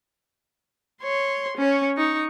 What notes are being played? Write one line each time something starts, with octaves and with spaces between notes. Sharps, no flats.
C#5 C6
C#4 C#5
D#4 C#6